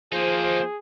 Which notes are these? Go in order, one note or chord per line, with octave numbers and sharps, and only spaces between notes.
F3 A#3 D#4 G#4 C5